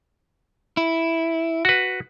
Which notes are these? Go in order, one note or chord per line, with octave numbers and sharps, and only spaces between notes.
E4
F#4 B4